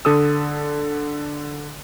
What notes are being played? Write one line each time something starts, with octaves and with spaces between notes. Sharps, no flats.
D3 A4 D#6 E6